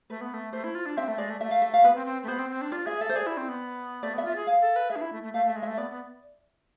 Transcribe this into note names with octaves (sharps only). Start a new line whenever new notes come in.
A3 B4
B3
A3
A3 C5
E4
F4
D4
C4 E5
A3
G#3 D5
A3
A3 E5
F5
E5
F5
B3 B4
C4
C4
A3
B3 C5
C4
C4
D4
F4 D5
G#4 E5
A4 E5
C5
G#4 D5
E4
C4
B3
A3 D5
B3 E5
F4
G#4 E5
F5
A4
B4
G#4 E5
D4
E4
A3
A3
A3 F5
A3 E5
G#3
A3 E5
B3 D5
B3